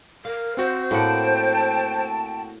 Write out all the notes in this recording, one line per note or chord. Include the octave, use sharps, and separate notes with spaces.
A#4 F5
C4 F#4 C5
A2 A#3 F#5 G5 A5